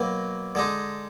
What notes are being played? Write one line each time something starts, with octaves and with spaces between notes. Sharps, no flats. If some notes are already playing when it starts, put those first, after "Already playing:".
Already playing: B2 F#3 A#3
D3 G#3 D#4